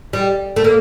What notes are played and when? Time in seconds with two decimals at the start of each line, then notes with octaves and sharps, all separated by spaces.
0.13 G3
0.56 A3
0.64 A#3